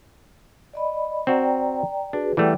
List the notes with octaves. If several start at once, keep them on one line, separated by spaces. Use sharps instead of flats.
D5 D#5 B5
C4 F#4 D5 G5 A#5
D4 F#4 G#4 B4
E3 G3 A3 D5 F#5 G5